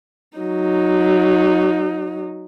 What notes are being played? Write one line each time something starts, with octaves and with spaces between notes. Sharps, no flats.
F#3 D#4